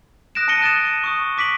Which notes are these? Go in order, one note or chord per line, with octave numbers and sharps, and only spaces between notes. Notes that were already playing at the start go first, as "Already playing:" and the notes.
D#6 F#6 A#6 D7 E7
A5 F#6 A#6 C#7 D#7 G7
D#6 F#6 A6 D7 E7
C#6 D#6
D6 B6 D7 F#7